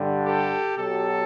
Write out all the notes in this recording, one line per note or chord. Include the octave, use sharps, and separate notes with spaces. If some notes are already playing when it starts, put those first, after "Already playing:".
Already playing: G2 D3 G3
G4 A4
B2 F#3 G4 A4